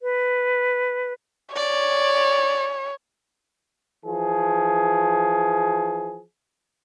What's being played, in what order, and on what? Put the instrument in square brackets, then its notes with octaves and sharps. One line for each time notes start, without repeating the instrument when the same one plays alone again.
[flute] B4
[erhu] C#5 [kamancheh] D5
[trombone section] E3 F3 G#4